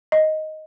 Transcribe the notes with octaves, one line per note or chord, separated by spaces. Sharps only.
D#5